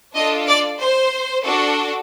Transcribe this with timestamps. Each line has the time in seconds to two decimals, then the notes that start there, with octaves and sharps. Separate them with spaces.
0.15 D4 F4 A4 D#5
0.47 D5
0.80 C5
1.45 D4 F#4 A4